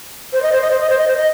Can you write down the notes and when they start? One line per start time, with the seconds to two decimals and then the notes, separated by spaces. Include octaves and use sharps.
0.33 C5
0.42 D#5
0.52 C5
0.61 D#5
0.70 C5
0.80 D#5
0.89 C5
0.98 D#5
1.07 C5
1.17 D#5